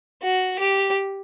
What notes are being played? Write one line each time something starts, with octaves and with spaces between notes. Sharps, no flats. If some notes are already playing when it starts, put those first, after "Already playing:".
F#4
G4